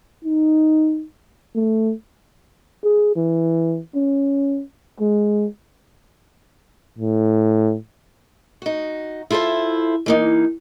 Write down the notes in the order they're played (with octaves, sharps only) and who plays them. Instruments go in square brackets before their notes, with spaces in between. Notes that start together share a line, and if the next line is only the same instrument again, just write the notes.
[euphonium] D#4
A3
G#4
E3
C#4
G#3
A2
[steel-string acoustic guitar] D#4 F#4
E4 F4 A4 A#4 C5
E3 A#3 D#4